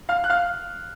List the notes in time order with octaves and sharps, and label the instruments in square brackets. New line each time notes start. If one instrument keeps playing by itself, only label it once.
[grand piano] F5 F6
F#6
F5 F6